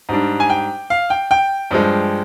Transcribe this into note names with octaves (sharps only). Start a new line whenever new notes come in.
G#2 G3 D4
G#5
G5
F5
G5
G5
G2 F3 G#3